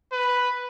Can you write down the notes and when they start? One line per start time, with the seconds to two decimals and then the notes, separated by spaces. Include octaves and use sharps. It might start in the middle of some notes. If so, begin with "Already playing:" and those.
0.13 B4